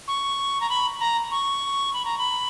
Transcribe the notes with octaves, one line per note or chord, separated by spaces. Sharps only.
C#6
A#5
B5
A#5
C#6
B5
A#5
B5